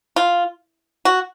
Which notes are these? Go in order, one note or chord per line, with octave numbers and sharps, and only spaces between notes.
F4
F#4